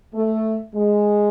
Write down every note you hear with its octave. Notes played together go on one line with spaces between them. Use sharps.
A3
G#3